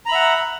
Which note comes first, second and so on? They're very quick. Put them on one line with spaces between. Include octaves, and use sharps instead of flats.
A#5 B5 E5 F#5